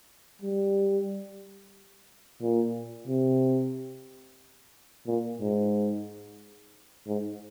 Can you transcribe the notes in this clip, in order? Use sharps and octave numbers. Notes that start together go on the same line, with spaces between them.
G3
A#2
C3
A#2
G#2
G#2